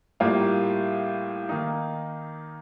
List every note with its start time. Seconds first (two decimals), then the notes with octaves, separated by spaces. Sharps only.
0.20 A2 G3 A#3 F4
1.49 D#3 A#3 D#4